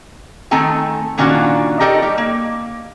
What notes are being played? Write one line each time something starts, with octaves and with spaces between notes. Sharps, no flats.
D#3 A3 C4 A4 G#5 A#5
A#2 D#3 C#4 D4 F4 F#4
D#4 G4 A4 A#4 D5 D#5
G3 G4
A#3